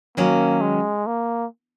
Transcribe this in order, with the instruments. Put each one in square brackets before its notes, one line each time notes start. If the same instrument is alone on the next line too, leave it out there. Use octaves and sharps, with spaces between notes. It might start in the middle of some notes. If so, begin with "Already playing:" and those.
[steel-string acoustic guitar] D#3 F#3 C#4 [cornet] A#3
[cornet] G#3
A#3